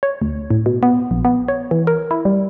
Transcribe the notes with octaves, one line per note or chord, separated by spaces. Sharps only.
C#5
D2
A2
B2
B3
A#1
B3
C#5
E3
A#4
E4
G3